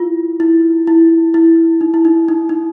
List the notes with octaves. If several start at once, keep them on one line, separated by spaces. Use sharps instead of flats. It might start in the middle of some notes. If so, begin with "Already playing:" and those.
Already playing: E4 F4
E4
E4
E4
D#4
E4
D#4
D#4
D#4